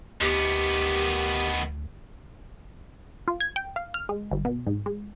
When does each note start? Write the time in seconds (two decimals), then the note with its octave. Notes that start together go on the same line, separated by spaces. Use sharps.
0.21 D2 D#3 B3 G4
3.28 F4
3.41 G#6
3.56 G5
3.76 F5
3.94 F6
4.09 G#3
4.31 G1
4.45 B2
4.66 G#2
4.86 G#3